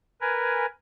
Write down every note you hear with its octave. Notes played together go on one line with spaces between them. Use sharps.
A#4 B4 G#5